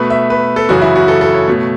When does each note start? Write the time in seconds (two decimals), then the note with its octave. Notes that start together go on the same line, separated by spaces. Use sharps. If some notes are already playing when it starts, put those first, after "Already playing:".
Already playing: B2 A3 B4
0.10 E5
0.30 B4
0.56 A4
0.69 F#2 C#3 E3 F#4
0.82 E4
0.96 F#4
1.08 A4
1.21 A4
1.34 C#5
1.48 B2 A3